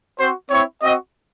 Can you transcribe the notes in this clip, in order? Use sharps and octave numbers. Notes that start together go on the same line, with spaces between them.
C4 F#4 C5
C4 E4 C#5
C4 F#4 D#5